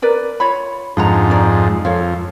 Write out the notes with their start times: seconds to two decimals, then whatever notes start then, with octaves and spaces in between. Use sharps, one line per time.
0.02 A#4 B4 D5
0.40 F4 C#5 B5
0.97 F2 G#2 D4 F#5 A#5
1.30 D#4 D5
1.85 F2 A4 C#5 F5